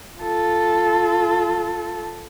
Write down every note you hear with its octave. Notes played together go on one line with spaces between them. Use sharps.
F4 A4